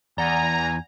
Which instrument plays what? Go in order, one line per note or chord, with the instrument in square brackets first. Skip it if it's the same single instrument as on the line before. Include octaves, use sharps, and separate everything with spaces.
[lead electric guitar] E2 [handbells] D5 F#5 [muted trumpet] G#5 [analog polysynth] A#5